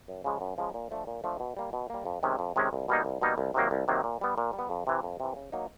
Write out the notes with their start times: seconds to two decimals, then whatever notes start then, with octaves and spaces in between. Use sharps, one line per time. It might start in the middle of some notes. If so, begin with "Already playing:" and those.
0.08 F#2
0.24 C#3 F3 G#3
0.41 F#2
0.58 C#3 F3 G#3
0.74 A#2
0.91 F3 A3 D4
1.07 A#2
1.24 F3 A3 D4
1.40 B2
1.57 G3 A#3
1.73 B2
1.90 G3 A#3
2.06 F2
2.23 C3 D#3 G#3 C#4
2.39 F2
2.56 C3 D#3 G#3 C#4
2.73 C2
2.88 B2 G3 A#3 D#4
3.05 C2
3.21 B2 G3 A#3 D#4
3.38 C2
3.54 C3 D#3 F#3 A#3
3.71 C2
3.88 C3 D#3 F#3 A#3
4.04 A#2
4.21 G3 B3
4.38 A#2
4.53 G3
4.59 B3
4.70 F2
4.87 C3 E3
5.03 F2
5.20 C3 E3
5.36 C#3
5.52 F#3 A#3 D#4